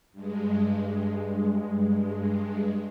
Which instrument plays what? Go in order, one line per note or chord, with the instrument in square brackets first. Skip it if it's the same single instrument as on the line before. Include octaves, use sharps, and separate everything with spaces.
[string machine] G2 G#3